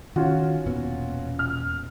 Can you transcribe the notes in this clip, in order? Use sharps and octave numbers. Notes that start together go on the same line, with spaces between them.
D#3 C#4 F4 F#4
E1 A#2 B3
F6